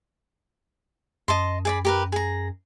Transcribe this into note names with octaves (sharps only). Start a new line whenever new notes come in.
F#2 D#5 A5 C6
G#4 D5 B5
G4 A#4 B4
G#4 A#5